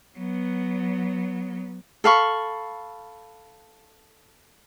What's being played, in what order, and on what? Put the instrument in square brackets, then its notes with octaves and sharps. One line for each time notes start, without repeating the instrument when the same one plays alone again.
[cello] F#3 B3
[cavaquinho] A4 F5 B5 C#6